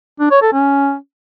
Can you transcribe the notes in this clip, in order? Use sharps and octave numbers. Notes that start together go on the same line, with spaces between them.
D4
C#5
A4
C#4